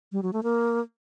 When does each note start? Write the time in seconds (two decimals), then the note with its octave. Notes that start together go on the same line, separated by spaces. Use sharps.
0.12 G3
0.23 F#3
0.33 A3
0.43 A#3